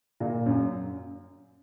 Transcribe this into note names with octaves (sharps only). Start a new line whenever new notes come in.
A#2
F#2